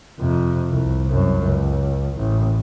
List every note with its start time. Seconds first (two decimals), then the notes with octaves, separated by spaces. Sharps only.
0.20 F2 C3
0.72 C2
1.07 C2 F#2
1.44 C#2
2.16 A1